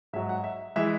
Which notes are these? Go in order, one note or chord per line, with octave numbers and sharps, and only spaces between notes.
G#2 F#3 E5
F#5
E5
E3 G#3 E5